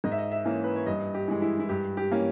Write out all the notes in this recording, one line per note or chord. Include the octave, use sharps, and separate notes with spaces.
G#2 D#5
E5
D#5
E5
E3 A#3 C#4
B4
C#5
G2 D#5
G4
E3 G#3
E4
E4
G2 G4
G4
E3 A#3 C#4